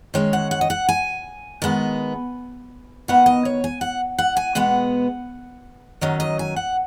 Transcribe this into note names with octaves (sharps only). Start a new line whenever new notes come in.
D#3 G#3 C#4 C#5
F#5
F#5
D#5
F#5
G#5
D#3 G#3 B3
D#3 B3 F#5
D#5
C#5
G#5
F#5
F#5
G#5
B2 G#3 B3 F#5
D#3 F#3 C#4 D#5
D#5
G#5
F#5